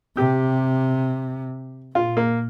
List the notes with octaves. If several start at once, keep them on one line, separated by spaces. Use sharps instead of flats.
C3 G4
A#2 F4
A#3